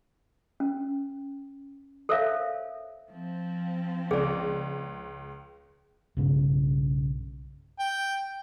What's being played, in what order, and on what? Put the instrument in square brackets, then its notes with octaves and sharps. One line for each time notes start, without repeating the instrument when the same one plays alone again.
[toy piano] C#4
A4 A#4 C5 C#5 E5 F5
[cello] F3 C4
[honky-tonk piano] C#2 [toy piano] G#4 D5
[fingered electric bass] B1 G2 C#3
[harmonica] G5